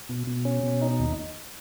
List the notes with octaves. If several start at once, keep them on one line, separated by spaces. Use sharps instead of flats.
B2
B2
C#4
B2
D#4
D#2